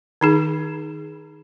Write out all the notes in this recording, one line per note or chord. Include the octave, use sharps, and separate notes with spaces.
D#3 D#4 G#4